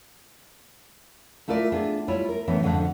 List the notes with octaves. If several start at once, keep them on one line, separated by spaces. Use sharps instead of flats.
A3 E4 F4 A#4 D5
B3 D4 F4 G#4
G3 E4 F4 C#5
A#4
A2 E3 B3 C#4 D4
F2 G#2 D3 D#3 D4 F#5